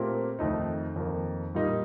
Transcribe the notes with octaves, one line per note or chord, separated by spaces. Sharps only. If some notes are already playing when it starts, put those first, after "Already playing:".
Already playing: A#2 A3 C4 G4 A#4
F2 D#3 A3 D#4
F2 D#3 A#3
A#2 G3 A#3 D#4